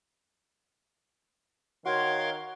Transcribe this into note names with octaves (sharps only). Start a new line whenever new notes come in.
D#3 F#4 A#4 C#5 F5 C6